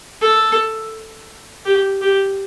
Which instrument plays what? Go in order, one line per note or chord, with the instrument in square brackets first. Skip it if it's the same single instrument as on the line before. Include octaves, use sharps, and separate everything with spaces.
[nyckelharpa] A4
G4
G4